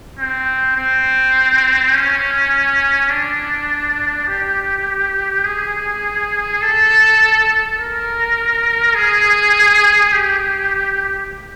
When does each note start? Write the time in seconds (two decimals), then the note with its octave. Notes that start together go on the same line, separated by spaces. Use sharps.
0.19 C4
0.77 C4
1.94 C#4
3.10 D4
4.28 G4
5.45 G#4
6.62 A4
7.78 A#4
8.95 G#4
10.12 G4